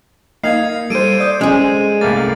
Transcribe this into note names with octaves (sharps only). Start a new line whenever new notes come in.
A#3 D#4 F5 G#6 C7
G3 A4 C5 D7 D#7
D5 D#6 G6
G#3 C#4 G#4
C2 A3 A#3 A6